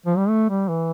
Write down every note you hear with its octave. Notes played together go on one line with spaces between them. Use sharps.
F3
G3
A3
G3
E3